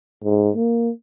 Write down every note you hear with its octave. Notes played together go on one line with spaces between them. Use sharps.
G#2
A#3